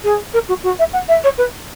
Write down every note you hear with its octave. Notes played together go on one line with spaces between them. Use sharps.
G#4
A#4
F#4
F#4
E5
F#5
E5
C#5
B4